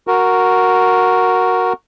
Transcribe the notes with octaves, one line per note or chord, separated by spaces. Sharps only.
F#4 A#4